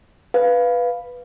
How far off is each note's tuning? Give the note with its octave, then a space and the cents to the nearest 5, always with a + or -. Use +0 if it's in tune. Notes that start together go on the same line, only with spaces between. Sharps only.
B4 +0 F5 +0